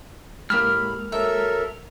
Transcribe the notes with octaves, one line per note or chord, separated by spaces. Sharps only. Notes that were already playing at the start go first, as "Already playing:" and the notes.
A2 G#3 A#3 G4 B5 E6 F6
F#3 A4 A#4 E5